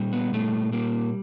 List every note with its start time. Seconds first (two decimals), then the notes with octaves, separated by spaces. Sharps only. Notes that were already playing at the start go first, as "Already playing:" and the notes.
Already playing: A#2 G3
0.13 B3
0.33 A#2 A3
0.72 G3 A#3